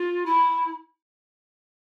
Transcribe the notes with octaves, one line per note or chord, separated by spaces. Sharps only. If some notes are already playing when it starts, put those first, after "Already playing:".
Already playing: F4
E4